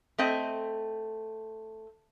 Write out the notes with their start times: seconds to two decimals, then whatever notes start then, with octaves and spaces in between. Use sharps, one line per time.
0.18 A3 C4 D#5